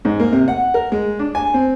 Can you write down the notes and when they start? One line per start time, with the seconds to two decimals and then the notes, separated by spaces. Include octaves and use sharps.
0.05 G#2
0.20 A#3
0.32 C3
0.48 F#5
0.74 A#4
0.92 G#3
1.19 D4
1.35 G#5
1.54 C4